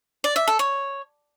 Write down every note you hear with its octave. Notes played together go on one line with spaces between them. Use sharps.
D5
E5
A4
C#5